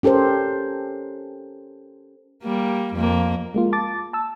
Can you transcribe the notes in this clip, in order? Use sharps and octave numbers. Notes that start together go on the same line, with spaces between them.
C#4 G4 A4 A#4 C5
G3 A#3
F2 A#3
G#3 A#3 F4
A5 D6 A6
A5 E6